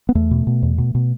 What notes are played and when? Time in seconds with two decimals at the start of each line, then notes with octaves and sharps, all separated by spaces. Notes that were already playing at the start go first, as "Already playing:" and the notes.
0.09 B3
0.15 E2 A3
0.31 B2
0.47 B2
0.62 E2
0.78 B2
0.95 B2